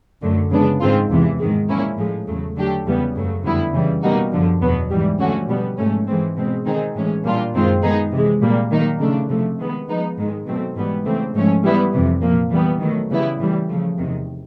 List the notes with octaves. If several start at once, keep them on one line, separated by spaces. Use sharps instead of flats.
F#2 D3 F#3 A3
C#3 F3 G#3 B3 D4
G#2 D#3 G#3 C4 F4
E2 C3 E3
G#2 D#3 G#3
A#2 F3 A#3 C#4 E4
A2 F3 G#3
E2 C#3 F#3 A3
D3 F#3 A3 D4 G4
E2 C#3 E3 G3 B3
F#2 C#3 F#3 A3
F2 D3 G3 B3 E4
C#3 E3 G3
B2 G3 A#3 D#4 F#4
F#2 D3 F3
E2 B2 F#3 B3
G#2 E3 G3
D3 F3 A3 C#4 F#4
B2 G3 B3
G#2 F3 A3 C#4
G#2 E3 G#3 C4
B2 G#3 C4
D#3 G#3 C4 D#4 G#4
A2 E3 G#3 C#4
A#2 G3 A#3 D4 F4
F#2 D#3 G#3 C4 F4
D#3 G#3 B3 D#4 G#4
C3 E3 G#3
A#2 G3 A#3
D#3 F#3 A#3 D#4
C#3 F3 A3 D4
C3 F3 A3
D#3 G#3 B3
F3 G#3 B3 D#4
G#2 D#3 G#3
B2 F#3 A3 C4
G#2 E3 G3 B3
C#3 E3 A3 C4
G#2 F3 A3 C#4
E3 G3 B3 E4
F2 C3 E3
A#2 F3 A#3
E3 G3 B3
D#3 F#3 A3
C#3 E3 G3 B3 E4
A2 E3 G3
C#3 F3 A3
E2 C3 D#3